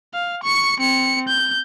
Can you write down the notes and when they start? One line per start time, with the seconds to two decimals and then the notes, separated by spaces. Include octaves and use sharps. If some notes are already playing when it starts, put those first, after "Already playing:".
0.14 F5
0.43 C#6 C#7
0.80 C4 C#7
1.28 G6